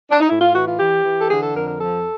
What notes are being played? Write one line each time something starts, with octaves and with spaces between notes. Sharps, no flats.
D4
D#4
A2 E4
F4
E3 F#4
F4
E3 G4
E3
A4
D3 G#4
A4
F2 A#4
A#4
F3 A4